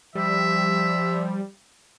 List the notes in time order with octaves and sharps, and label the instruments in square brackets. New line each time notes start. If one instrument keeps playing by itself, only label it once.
[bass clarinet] F3 [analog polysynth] G3 [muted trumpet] E5